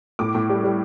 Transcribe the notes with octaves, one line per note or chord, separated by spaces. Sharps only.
A2 D6
A2
G3
G3